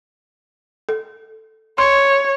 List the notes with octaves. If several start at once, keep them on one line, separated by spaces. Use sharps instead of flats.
A4
C#5 C6